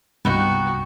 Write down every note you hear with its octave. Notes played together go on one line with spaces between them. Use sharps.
C2 G2 B3 D#4 F#4 G5